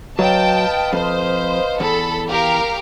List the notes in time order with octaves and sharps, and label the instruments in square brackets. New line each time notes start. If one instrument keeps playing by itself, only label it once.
[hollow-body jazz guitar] F#3 [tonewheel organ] B4 D#5 F5 [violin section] G5 A5
[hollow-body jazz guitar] F2 [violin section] C5
[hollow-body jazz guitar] E2 [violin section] A4 B5
[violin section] G4 A#4 F5